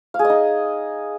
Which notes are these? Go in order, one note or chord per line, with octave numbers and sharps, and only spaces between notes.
F5
G#4
D#5
D#4